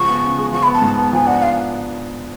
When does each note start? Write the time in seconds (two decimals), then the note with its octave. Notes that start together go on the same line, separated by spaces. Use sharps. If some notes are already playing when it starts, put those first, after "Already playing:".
Already playing: C#3 F3 G#3 C#6
0.09 B3
0.23 C#3
0.39 G#3
0.52 F3 C#6
0.63 B5
0.67 B3
0.73 A5
0.82 G#2
0.98 B3
1.12 F3 G#5
1.27 D4 F#5
1.42 F5